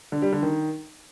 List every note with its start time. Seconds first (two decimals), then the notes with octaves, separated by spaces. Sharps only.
0.12 D3
0.22 G3
0.32 D3
0.43 D#3